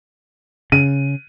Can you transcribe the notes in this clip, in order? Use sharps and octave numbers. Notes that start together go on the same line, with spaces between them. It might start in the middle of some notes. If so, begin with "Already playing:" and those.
C#3 D#7